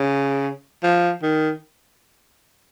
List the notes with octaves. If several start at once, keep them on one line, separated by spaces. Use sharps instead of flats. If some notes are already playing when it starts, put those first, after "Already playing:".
Already playing: C#3
F3
D#3